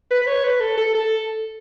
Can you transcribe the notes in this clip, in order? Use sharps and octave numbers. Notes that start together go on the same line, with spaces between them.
B4
B4
C#5
B4
A4
A4
A4